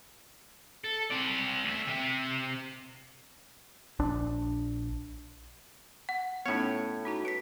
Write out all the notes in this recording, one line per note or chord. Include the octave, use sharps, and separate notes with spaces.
A4
C4 D5
D2 E5
C3 E5
A#1 D4
F#5
A2 B3 C#4 D#4 C#5
D#4 F#4 A#5
B4 B6 C#7 D7